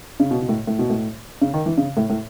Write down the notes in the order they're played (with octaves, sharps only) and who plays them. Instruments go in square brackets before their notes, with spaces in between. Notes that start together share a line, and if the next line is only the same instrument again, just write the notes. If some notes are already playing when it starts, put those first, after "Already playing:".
[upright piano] C#3
B2
B2
A2
A2
B2
A2
C#3
D#3
E3
C#3
A2
A2